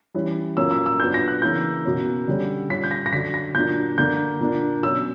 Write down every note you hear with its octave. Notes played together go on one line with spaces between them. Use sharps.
E3 G3 C#4
A#2 F#3 A#3 C#4 E6
E6
E6
A#2 F#3 B3 D4 G6
A#6
F#6
C#3 E3 A#3 C#4 G6
B2 A#3 C#4
D3 G3 C#4
A#2 G3 C#4 B6
G6
A#6
A#6
D3 F#3 C#4 B6
A#6
A#2 F#3 A#3 D4 G6
D3 A#3 D4 G6
A#2 A#3 D4
B2 F#3 C#4 E6